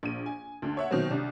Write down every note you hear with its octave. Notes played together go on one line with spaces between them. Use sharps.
A#1 D#7
G#5
D2 D3
C#5 E5 F#5
B2 D#3 F#3 C4
C2 D4